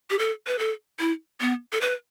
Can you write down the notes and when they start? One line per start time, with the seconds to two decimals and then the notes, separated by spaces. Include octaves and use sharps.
0.10 G4
0.19 A4
0.47 B4
0.59 A4
1.00 E4
1.41 B3
1.73 A4
1.81 B4